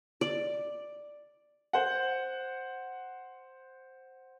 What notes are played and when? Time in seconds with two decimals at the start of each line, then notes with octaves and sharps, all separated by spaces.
0.21 D5
1.73 C5 F#5